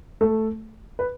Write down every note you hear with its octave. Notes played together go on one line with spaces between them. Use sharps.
A3 A4
B4